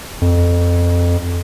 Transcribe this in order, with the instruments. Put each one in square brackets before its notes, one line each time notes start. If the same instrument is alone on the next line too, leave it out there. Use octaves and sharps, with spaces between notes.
[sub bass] F2